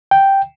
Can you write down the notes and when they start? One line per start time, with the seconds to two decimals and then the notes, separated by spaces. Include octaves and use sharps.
0.11 G5